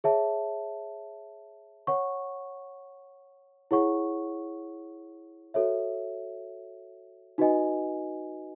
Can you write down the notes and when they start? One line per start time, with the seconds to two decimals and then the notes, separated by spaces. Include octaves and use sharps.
0.04 G#4 C#5 E5 A5
1.87 C#5 F#5 C#6
3.71 E4 G#4 C#5 F#5 C#6
5.54 F#4 A4 C#5 E5
7.38 D#4 F#4 B4 D#5 G#5